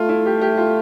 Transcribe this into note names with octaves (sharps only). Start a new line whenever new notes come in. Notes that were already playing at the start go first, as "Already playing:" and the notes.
Already playing: A3 F4
E4
G4
G4
F4